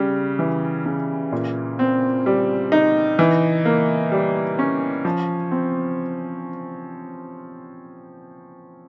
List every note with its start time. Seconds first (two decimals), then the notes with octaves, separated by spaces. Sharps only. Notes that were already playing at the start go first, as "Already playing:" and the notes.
Already playing: C#3 G3
0.39 E3
0.86 C#3
1.32 A#2
1.79 C4
2.26 G3
2.72 D#4
3.19 E3
3.65 A#3
4.12 G3
4.59 C#4
5.05 F3
5.51 C4